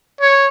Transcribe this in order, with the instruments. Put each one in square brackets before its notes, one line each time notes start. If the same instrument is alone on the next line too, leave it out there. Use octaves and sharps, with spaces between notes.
[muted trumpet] C#5